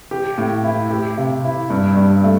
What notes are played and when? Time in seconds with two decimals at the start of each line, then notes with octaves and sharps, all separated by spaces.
0.11 G4
0.38 A2
0.64 E4
0.91 G4
1.18 C3
1.44 E4
1.70 G2
1.97 G2
2.24 A3